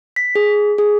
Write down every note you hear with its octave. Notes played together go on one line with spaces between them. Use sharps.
B6
G#4
G#4